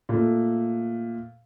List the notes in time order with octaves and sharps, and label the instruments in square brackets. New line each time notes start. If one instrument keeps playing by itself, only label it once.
[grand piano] A#2 A3